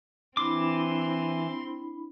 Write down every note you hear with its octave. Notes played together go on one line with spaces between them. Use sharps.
E3 C4 D4 E4 B5 C6 D6